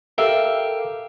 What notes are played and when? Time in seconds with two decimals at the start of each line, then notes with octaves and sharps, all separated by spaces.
0.18 G4 A4 A#4 E5 F5